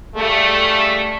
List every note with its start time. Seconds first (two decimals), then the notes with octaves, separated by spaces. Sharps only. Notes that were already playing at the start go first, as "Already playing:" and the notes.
0.16 C#3 G3 A3